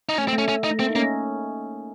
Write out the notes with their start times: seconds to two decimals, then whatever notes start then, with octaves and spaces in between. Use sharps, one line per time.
0.09 D#4
0.18 A3 C#4
0.28 C4
0.33 A3
0.38 C#4
0.49 C#4
0.64 D#4
0.71 A3
0.80 A#3 C4
0.90 D#4
0.96 A#3 C#4